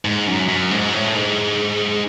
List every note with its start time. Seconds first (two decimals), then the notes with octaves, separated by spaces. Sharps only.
0.05 G#2
0.27 F#2
0.48 F#2
0.71 G#2
0.93 A2
1.15 G#2